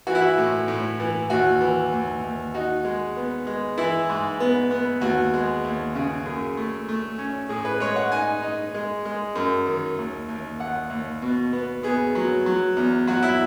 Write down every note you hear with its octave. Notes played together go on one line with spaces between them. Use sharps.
E3 F#4
E4
F#4
A2
A2
E3
D#2 F#4
E3
D#2
D#2
D#4 F#4
G#3
B3
G#3
E3 E4
G#2
B3
B3
D#2 F#4
G#3
D#2
C#3
F#2 G#4
A3
A3
C#4
A2 G#4
B4
G#3 C#5
F#5
D#4 G#5
D#4
G#3
G#3
F#2
D#3
D#2
D#2
D#2 F#5
D#2
B2
B3
B3 G#4
F#3
F#3
E2
F#3 F#4
E4